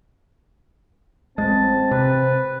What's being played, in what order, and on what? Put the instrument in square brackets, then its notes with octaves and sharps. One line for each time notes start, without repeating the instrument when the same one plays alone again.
[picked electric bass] A1 A2 G#3 [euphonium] C4 [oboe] A5
[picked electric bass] C3 [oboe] B4